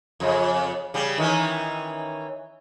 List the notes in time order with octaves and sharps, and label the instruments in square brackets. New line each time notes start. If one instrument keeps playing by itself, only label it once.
[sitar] F2 C#3
C#3 G3
D#3 E3 C#4